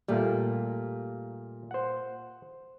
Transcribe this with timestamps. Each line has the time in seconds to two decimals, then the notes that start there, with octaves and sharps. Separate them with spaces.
0.08 A#2 G3 A3 A#3
1.71 C5 F#5